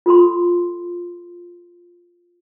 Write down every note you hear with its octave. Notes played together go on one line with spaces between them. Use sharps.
F4 A4 B5 C6